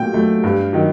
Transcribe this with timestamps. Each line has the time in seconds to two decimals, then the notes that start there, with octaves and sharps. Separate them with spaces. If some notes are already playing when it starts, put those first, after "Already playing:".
Already playing: A#2 F#3 A3 G5
0.14 F#3 A3
0.44 G2
0.73 D#3 F#3